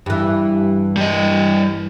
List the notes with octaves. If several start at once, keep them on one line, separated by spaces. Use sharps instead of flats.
G2 E3
G3 D#5